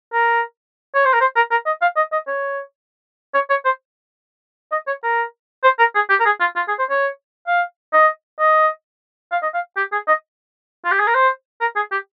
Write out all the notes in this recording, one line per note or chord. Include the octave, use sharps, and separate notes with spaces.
A#4
C#5
C5
A#4
C5
A#4
A#4
D#5
F5
D#5
D#5
C#5
C#5
C#5
C5
D#5
C#5
A#4
C5
A#4
G#4
G4
A#4
G#4
F4
F4
G#4
C5
C#5
F5
D#5
D#5
F5
D#5
F5
G4
G#4
D#5
F4
G4
G#4
A#4
C5
A#4
G#4
G4